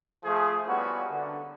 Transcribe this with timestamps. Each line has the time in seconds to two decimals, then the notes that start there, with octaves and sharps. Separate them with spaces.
0.24 F3 A3 G#4
0.67 G3 A#3 B3 C#4 E4 F#4
1.10 D3